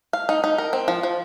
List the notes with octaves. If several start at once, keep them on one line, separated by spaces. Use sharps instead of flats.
F5
D#4
D#4
A#4
C4
F3
F3